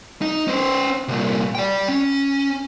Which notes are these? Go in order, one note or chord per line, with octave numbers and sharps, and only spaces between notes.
D#4
C#4 C5
C2 A#2
D5 G5
C#4